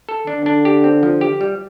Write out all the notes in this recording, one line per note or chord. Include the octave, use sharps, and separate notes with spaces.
A4
D3 D4
D4
G4
C4
F3
G4
G3